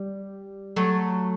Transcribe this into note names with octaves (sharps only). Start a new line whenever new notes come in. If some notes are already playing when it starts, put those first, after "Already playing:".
Already playing: G3
F#3 A3